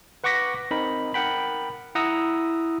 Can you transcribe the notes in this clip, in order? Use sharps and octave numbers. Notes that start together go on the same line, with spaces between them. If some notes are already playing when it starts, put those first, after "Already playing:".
B4 F#5 C#6 D6 A#6 B6
C4 D#4 A#4 B5
A#4 F#5 G5 B5
E4 F#5 A#5 D#6 E6